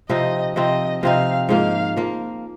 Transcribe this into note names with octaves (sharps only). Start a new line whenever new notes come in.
C3 F3 C4 D#4 D#5
C3 F3 C4 D#4 D#5
C3 F3 C4 D#4 F5
G#2 F3 A#3 F5
F3 A#3